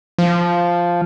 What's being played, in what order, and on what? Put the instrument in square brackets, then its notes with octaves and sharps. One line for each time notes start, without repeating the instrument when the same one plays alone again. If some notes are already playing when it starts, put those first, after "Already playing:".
[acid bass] F3